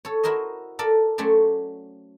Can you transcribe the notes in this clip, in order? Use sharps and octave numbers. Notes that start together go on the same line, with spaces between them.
A4 C#5
E4 F#4 A#4 C5 D#5
A4 A#4 D5 A5
F#3 A3 C#4 C5 D5